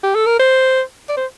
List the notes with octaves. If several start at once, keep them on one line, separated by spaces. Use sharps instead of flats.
G4
A4
A#4
C5
D5
C5